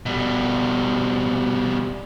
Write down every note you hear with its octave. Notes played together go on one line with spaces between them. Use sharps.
B2 G3